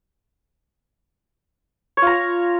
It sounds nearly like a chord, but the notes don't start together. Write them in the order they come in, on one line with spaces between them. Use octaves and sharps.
C#5 F4 A#5